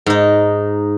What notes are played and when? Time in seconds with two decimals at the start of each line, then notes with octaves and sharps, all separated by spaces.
0.06 G#2 D#4